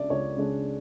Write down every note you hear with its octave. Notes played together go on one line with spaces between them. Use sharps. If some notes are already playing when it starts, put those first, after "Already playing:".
Already playing: C#3 G#3 D4 D5 E5
C#2 C#5
C#3 G#3 D4